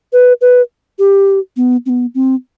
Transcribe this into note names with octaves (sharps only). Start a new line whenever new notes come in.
B4
B4
G4
B3
C4
B3
C4